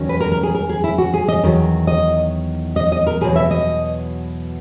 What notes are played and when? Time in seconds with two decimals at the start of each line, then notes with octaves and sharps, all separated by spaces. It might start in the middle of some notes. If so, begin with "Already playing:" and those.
Already playing: E2 D#3 F#3 C#4
0.09 B4
0.20 A#4
0.32 A#4
0.43 G#4
0.55 A#4
0.69 G#4
0.84 E4
0.98 F#4
1.14 G#4
1.28 D#5
1.43 E2 D#3 F#3
1.87 D#5
2.76 D#5
2.92 D#5
3.07 A#4
3.21 E2 B2 F#3 G#4
3.36 E5
3.51 D#5